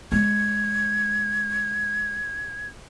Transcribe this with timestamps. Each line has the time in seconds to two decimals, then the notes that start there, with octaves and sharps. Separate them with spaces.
0.12 G#3 G#6